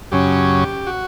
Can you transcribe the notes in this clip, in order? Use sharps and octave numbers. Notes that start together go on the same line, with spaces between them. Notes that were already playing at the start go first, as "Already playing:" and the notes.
F#2 C#3 F#3 C#4 G4
F#4